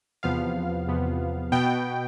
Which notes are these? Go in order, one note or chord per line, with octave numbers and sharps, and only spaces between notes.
E2 C3 F3 B3 F5
E2 C3 F3 B3
B2 B3 G5